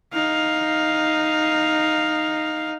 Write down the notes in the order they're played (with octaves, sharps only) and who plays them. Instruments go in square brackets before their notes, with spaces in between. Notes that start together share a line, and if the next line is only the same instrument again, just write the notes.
[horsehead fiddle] D#4 F5